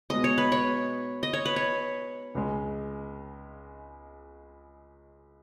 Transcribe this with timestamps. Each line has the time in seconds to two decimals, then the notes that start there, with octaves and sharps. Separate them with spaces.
0.10 B2 G#3 B3 D#4 G#4 D#5
0.24 C#5
0.38 B4
0.52 C#5
1.23 D#5
1.33 C#5
1.45 B4
1.56 C#5
2.35 C#2 C#3 G#3